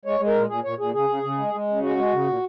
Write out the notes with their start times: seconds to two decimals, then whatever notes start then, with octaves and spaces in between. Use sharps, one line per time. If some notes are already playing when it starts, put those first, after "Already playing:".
0.05 G#3 C#5
0.20 G#3
0.27 A#4
0.35 A#2
0.49 A#2 G#4
0.64 A#2 C#5
0.78 A#2 G#4
0.94 C#3 G#4
1.09 C#3
1.23 C#3
1.38 G#3
1.54 G#3
1.68 C#3
1.83 G#3 F#4
1.97 G#3
2.12 C#3
2.27 A#2